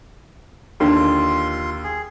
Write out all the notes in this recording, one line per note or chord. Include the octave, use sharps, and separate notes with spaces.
D#2 D3 F4 C6
G#4